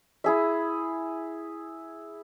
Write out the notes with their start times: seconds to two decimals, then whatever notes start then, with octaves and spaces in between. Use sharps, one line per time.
0.24 E4 G#4 E5